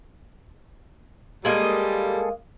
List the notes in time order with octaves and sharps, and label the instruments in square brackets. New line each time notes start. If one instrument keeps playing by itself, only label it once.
[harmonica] G3 [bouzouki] G#3 A#3 D#5 [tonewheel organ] G#4 A4